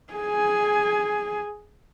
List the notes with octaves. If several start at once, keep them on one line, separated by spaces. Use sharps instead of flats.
G#4 G#5